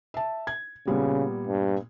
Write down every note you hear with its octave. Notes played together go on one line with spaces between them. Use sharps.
E5 A5
G#6
A#2 C#3 G3 B3
G2